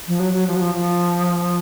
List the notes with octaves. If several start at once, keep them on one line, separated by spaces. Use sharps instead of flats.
F3
F#3
F#3
F3
F#3
F3
F3